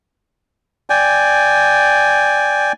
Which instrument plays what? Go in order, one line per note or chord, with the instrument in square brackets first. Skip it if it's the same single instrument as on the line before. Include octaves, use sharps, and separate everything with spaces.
[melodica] D5 G5 G#5